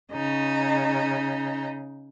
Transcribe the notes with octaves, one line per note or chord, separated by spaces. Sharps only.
C#3 D#4